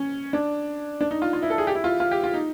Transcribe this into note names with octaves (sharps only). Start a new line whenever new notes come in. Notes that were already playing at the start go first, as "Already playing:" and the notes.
Already playing: C#4
D4
D4
D#4
F4
F4
E4
A4
G#4
G4
E4
F4
F4
G4
F4
D#4